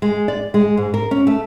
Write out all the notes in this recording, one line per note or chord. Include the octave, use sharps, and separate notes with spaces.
G#3
D5
G#3
G#2
A#4
C#4
A3